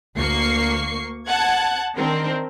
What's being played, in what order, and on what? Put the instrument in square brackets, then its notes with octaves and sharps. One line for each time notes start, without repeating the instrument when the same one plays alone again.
[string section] D2 A#3 C#6 C7
F#5 A5 F#6 G#6
D#3 C4 D4 A#4